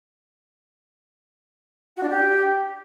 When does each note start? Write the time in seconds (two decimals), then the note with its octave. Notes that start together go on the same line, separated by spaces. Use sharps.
1.96 F#4
2.03 D4
2.09 G4